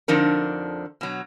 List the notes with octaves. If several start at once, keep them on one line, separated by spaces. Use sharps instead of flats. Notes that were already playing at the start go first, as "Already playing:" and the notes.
F2 D3 F3 D4 D#4 A#4
B2 F#3